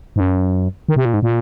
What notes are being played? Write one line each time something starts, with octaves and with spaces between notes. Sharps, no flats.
G#2
F#2
D#3
C3
A#2
G#2
A#2